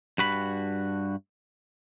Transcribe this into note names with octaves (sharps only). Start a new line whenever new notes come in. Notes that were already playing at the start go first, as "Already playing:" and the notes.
G2 F#4 B5